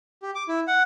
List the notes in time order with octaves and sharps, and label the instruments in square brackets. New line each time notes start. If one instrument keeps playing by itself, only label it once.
[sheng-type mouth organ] G4
D6
E4
F#5